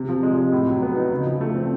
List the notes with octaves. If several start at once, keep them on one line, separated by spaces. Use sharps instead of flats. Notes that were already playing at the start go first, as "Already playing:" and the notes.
Already playing: C3
F3
G#3
C3
A2
F#3
B3
D#4
C#3
F3
A3
C4